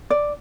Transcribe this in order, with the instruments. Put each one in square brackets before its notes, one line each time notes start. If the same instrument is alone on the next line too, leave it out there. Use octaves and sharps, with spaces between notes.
[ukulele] D5